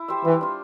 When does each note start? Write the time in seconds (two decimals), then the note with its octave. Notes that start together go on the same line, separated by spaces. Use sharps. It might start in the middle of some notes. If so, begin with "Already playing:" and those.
Already playing: E4
0.08 G4 C5 E5
0.25 E3 G3
0.41 D4 F4